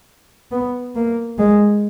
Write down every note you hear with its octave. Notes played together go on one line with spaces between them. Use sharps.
B3
A#3
G#3